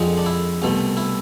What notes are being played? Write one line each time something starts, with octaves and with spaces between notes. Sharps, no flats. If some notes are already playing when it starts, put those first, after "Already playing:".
Already playing: F2 D3 G#3
D4
E4
C2 B2 A3
E4